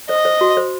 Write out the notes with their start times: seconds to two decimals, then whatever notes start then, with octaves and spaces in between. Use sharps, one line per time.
0.09 C5 D#5
0.25 C5
0.41 F#4
0.57 C5